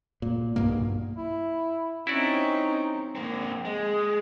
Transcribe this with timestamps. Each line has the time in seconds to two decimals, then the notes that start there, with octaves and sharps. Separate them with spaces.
0.22 A#2
0.56 B1 G2 B2 A#3
1.17 E4
2.07 C4 C#4 D#4 E4 F#4 D5
3.15 A#3 C4
3.65 G#3